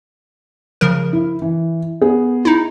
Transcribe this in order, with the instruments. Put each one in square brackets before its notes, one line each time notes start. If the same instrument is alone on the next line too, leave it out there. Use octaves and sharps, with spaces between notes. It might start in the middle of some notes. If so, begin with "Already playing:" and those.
[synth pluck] C#3 F3 A#4
[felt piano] E4
E3
B3 G#4
[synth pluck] D#4 E4